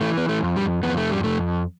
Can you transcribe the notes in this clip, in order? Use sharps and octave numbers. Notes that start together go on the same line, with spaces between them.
E3 A3
B3
A3
F2
G3
F2 B3
A3
G3
F2 A3